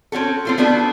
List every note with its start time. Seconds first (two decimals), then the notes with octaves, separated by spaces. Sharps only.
0.12 C4 C#4 F#4 A4
0.45 C4 F4 A4
0.58 A3 B3 D4 F4 F#4 A4